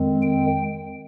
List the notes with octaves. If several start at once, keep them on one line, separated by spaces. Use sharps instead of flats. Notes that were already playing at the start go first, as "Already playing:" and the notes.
Already playing: F2 D#3 G#3 C4
G5